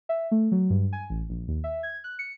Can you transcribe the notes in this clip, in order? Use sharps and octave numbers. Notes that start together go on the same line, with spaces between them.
E5
A3
F#3
G2
G#5
A1
A#1
D#2
E5
G#6
F#6
C#7